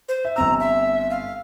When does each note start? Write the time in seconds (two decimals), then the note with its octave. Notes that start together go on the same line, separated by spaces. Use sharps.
0.09 C5
0.25 E5
0.36 G1 C4 A#5 E6
0.60 E5
1.10 F5